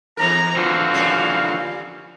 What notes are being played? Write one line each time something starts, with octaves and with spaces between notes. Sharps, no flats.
E2 G#2 A#4 A#5
D3 E3 F3 C4 F#4 F5
A#2 G3 C#4